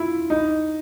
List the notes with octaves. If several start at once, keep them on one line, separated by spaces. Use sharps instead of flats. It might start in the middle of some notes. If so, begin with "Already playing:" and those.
Already playing: E4 F4
D#4